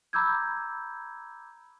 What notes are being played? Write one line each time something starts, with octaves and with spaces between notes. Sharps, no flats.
A#5 B5 D6 E6 G6 G#6